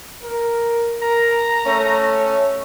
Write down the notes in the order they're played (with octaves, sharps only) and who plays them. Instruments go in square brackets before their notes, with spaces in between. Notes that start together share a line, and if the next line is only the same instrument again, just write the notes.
[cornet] A#4
[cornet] A#4 [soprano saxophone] A#5
[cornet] A3 [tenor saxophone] C#4